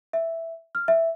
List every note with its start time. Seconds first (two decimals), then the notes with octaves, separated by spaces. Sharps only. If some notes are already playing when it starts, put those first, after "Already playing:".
0.13 E5
0.75 F6
0.88 E5